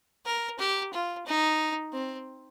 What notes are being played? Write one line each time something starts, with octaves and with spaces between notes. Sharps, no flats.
A#4
G4
F4
D#4
C4